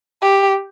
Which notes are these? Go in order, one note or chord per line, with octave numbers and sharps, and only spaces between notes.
G4